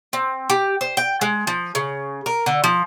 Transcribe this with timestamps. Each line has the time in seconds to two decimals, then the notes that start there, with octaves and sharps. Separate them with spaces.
0.13 C4
0.50 G4
0.81 C5
0.97 G5
1.21 G#3
1.47 F3
1.75 C#3
2.26 A#4
2.46 D3
2.64 F3